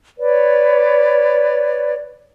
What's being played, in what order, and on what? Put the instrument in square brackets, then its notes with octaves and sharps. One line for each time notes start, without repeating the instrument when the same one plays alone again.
[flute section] B4 C#5 D5